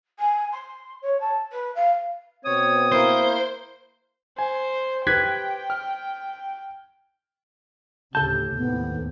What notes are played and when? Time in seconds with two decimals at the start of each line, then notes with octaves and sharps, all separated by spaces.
0.19 G#5
0.52 C6
1.02 C#5
1.20 A5
1.52 B4
1.75 F5
2.45 B2 B3 C4 C#5 D#6
2.92 A#3 E4 A#4 C5
4.38 C5 G#5
5.07 G4 B4 G5 F#6 G#6 B6
5.70 F6
8.15 D2 A2 C#3 G4 A4 A5 G6
8.55 D#2 A2 C3 B3